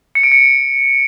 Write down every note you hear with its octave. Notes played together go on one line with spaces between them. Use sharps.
C#7
D7
C#7